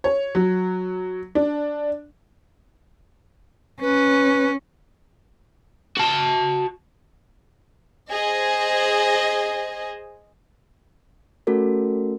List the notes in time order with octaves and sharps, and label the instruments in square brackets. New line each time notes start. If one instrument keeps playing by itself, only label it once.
[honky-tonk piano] C#5
F#3
D4
[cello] C#4 [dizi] B4
[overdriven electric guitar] F#4 A5
[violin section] G#4 C5 D#5
[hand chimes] A3 C#4 F#4 A4 A#4